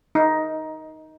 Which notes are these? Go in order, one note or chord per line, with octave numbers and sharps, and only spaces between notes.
D#4